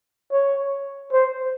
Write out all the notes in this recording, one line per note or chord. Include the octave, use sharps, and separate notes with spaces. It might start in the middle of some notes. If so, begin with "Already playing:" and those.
C#5
C5